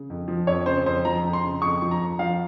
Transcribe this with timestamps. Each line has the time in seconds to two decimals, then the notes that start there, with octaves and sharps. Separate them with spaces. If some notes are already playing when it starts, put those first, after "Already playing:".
Already playing: C#3
0.10 F2
0.28 F3
0.47 F2 C#5
0.66 C#3 C5
0.86 F2 C5
1.05 F3 A#5
1.25 F2
1.33 C6
1.44 C#3
1.62 F2 C#6
1.82 F3
1.91 A#5
2.00 F2
2.19 F3 F5